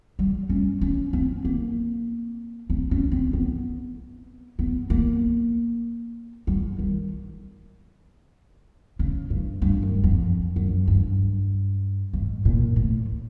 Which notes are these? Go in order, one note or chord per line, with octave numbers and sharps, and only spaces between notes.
G3
C#4
C#4
C4
A#3
C4
C#4
C4
B3
B3
A#3
G3
D#3
C#3
G2
G2
F#2
F2
F#2
G2
G#2
A#2
A2